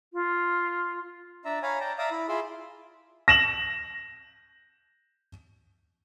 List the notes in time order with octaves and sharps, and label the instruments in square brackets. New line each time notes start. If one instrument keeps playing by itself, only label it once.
[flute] F4
[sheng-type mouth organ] D4 D5 E5 A#5
C#5 F5 G#5 A#5 B5
D5 G5 A5 A#5
D5 E5 F5 A#5 D6 D#6
E4 B5
F4 G#4 E5 B5 C6 D6
[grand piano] A#6 E7 F#7